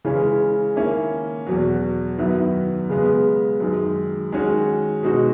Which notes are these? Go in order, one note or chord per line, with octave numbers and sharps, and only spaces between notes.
C#3 E3 G#3 C#4
D#3 A#3 C#4 E4
E2 B2 F#3
F#2 D#3 F#3 B3 E4
C#3 G#3 B3
F#2 D#3 G#3
D#3 G#3 C#4 F#4
B2 G#3 D#4 F#4